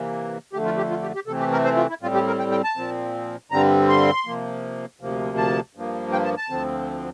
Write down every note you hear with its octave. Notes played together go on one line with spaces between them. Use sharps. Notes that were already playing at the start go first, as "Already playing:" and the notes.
Already playing: C3 E3 A#3
F2 D3 A3 G4
F4
G4
F4
G4
G4
C3 E3 A3 C4 A4
G4
A#4
C5
F4
E4
A2 G3 C4 F4
G4
A#4
G5
G5
A5
A#2 F3 C4
G2 D3 G3 C4 A#5
C6
C3 F3 A#3
D2 C3 F3 A#3
A5
G2 F3 A#3
G5
A5
A5
D2 D3 F3 C4